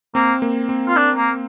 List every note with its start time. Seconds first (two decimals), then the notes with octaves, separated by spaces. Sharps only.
0.15 A#3 C4
0.42 A#3
0.69 C4
0.88 F4
0.96 D4
1.16 A#3